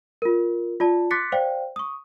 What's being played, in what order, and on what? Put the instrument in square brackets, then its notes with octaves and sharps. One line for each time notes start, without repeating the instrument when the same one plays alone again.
[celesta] F4 A#4
F4 D5 A5
C6 D6 F#6 A6 B6 C#7
C5 D5 F5 G5
C#6 D#6